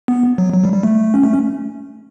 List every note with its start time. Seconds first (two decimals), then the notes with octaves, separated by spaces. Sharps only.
0.08 B3
0.38 F#3
0.54 F#3
0.64 G3
0.74 G3
0.83 A3
1.14 C#4
1.23 A3
1.33 C#4